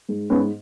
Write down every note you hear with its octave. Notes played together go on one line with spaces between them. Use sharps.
G#2
G#2 B3 C#4